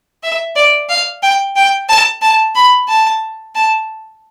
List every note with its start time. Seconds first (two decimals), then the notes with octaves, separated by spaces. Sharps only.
0.23 E5
0.56 D5
0.89 F5
1.22 G5
1.56 G5
1.89 A5
2.22 A5
2.55 B5
2.88 A5
3.55 A5